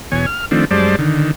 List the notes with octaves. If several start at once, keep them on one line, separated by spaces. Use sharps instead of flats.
E2 B2 C#5 G#5
F6
D#3 F3 A3 C4 D4
F#2 G3 G#3 C5 D5 A5
D3 D#3